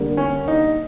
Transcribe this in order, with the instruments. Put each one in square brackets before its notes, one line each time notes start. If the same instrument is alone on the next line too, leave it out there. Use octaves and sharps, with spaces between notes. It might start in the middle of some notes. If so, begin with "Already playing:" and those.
Already playing: [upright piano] D3 G3 A#3
[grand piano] C#4
D#4